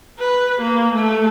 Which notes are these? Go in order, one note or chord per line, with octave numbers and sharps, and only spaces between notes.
B4
A#3
A3